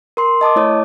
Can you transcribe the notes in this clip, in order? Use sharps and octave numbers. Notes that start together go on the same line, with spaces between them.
A#4 C6
D#5 A5 D6 D#6
A3 E4 C#5 D#6